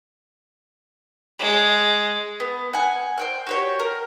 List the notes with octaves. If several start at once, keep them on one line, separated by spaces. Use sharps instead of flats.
G#3
B3
F#5 G#5
C5 G5 F#6
F#4 G4 C#5
A#4